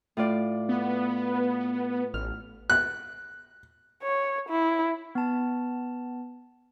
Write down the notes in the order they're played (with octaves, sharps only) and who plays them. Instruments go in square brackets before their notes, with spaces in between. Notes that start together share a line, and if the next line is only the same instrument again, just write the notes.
[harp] A2 F4 D5
[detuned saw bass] B3
[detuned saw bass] A1 [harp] F6
[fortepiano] F#6
[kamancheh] C#5
E4
[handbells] B3 A5